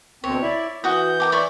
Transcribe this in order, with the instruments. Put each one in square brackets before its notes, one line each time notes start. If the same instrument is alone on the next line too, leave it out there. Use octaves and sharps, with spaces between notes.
[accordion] D2 B2 C4 [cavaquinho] C#5
[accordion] E4 D5 E5
[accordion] E3 G6 [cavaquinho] F#4 D#6
[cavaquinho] A#4 G5 D6
E4 D5 C#6